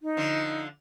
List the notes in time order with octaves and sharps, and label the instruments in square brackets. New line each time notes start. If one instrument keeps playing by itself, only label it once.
[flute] D#4
[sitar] D3 F3